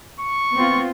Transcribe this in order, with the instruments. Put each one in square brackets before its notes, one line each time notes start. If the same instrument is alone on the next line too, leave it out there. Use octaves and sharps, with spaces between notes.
[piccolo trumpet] C#6
[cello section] B3 C4 F4